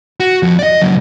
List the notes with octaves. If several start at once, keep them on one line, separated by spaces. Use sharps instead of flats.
F#4
F2
D5 D#5
C#2 F#3